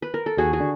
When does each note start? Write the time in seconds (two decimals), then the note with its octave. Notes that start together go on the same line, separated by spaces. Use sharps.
0.02 B4
0.14 A#4
0.26 A4
0.37 D#2 F#4 G#4
0.53 F#4 G#4
0.60 D3